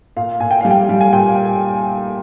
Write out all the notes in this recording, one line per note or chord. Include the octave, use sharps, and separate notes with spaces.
A#2 F5
A#2 G#5
G5
G3 F5
G5
G3
G#5
A#2 G5